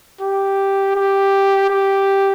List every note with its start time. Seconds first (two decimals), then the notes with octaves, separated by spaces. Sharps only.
0.21 G4
0.95 G4
1.69 G4